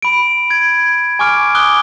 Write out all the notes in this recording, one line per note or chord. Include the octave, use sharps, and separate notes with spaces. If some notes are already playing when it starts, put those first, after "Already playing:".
B5 D7
G#6 D7
G#5 C#6 D6 F6 D7
D6 D#6 F#6 G7